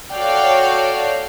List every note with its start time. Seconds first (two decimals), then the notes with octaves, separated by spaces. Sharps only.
0.12 F#4 A4 C#5 D5 F5 G5